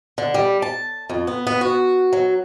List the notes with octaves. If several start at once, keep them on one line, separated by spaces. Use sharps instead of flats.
D3
G3
A5
F2
B3
B3
F#4
F#3